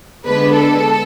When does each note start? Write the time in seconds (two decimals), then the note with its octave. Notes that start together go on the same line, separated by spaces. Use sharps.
0.24 D3 G#3 B3 D4 B4
0.53 A4